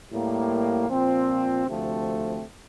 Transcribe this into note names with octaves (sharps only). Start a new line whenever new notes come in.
A2 G3 A#3
A#2 F3 C4
D2 C3 F3 A3 C4